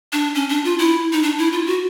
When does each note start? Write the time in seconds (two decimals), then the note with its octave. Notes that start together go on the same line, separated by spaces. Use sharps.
0.12 D4
0.35 C#4
0.49 D4
0.64 F4
0.79 E4
1.12 D#4
1.23 D4
1.38 E4
1.52 F4
1.66 F#4